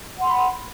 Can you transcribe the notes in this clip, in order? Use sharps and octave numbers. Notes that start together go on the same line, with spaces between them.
F#5 B5 C6